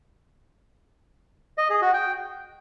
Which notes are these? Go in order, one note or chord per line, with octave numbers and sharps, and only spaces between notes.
D#5
G#4
F#4
G5